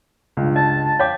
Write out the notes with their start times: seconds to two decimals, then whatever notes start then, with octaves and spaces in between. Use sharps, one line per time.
0.37 C#2 G2
0.56 D#5 A5
0.99 C#5 F5 G5 D6